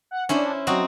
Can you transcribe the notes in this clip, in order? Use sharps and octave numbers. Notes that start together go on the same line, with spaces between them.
F#5
C#4 D4 E4 C5
F#3 C4 D#4 F#4